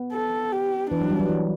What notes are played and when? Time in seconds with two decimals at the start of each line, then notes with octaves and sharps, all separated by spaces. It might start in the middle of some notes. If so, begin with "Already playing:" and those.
Already playing: B3
0.13 A4
0.52 G4
0.90 E3 D4
1.01 F#3
1.10 G3
1.20 F#3
1.29 E3